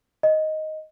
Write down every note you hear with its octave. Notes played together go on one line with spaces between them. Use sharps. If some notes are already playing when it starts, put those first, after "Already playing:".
D#5